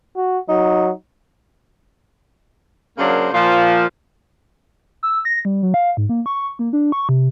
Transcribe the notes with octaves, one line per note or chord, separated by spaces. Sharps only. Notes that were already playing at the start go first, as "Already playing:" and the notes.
F#4
F#3 D#4
C#3 F#3 A#3 D4 A#4 C5
A#2 F3
E6
A#6
G3
F#3
F5
G#2
A#3
C#6
A#3
D4
C#6
C3